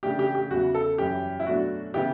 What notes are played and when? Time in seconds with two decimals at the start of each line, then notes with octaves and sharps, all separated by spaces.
0.03 C#3 E3 A3 D4 G4
0.19 G4
0.35 G4
0.50 E2 C#3 E3 F#4
0.74 A4
0.98 F#2 E3 G3 G4
1.40 E4
1.46 B2 F#3 A3 D4 F#4
1.94 C#3 E3 B3 E4 G4